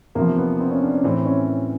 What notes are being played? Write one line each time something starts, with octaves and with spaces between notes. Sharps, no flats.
E2 C3 F3 A#3
B3
C4
C#4
D4
C#4
A2 E3 C4
C#4